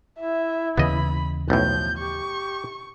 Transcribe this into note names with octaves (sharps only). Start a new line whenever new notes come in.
E4 E5
D#2 C#3 E3 B3 D#5 B5
B1 A2 F3 G6
G4 C#6